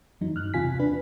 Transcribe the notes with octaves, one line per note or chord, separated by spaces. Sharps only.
F2 E3 F#3 D#4
G2 F6 F#6
E2 C3 F4 G#5 B6
D4 B4